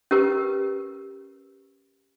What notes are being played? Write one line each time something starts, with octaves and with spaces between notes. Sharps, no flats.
C#4 G4 A#4 B4